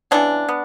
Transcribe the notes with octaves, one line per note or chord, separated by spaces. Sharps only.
C#3 E3 B3 D4
B3